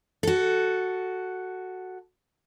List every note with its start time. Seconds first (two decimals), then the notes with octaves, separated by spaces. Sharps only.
0.23 F#4 A4